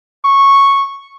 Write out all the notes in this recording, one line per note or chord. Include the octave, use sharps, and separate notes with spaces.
C#6